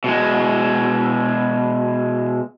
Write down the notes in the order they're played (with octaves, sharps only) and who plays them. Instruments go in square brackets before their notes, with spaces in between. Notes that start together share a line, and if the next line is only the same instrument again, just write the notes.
[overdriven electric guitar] B2 G#3